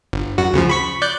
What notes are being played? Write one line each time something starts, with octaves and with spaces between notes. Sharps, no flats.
G1
F#2 F#4
D2 C#3 F3
B5 C#6 B6
D5 F#6 G6